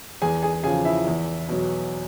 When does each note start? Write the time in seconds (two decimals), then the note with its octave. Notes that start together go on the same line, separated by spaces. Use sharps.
0.22 E2 G#4 G#5
0.43 G#4 G#5
0.63 C#3 F3 G#4 G#5
0.85 E4 E5
1.07 E2
1.48 B2 F#3